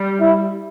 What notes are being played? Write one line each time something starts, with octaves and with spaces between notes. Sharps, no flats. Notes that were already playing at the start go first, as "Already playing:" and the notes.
Already playing: G3
E4